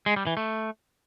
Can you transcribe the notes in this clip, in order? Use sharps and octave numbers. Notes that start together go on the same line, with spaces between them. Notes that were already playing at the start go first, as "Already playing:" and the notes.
G#3
G3
E3
A3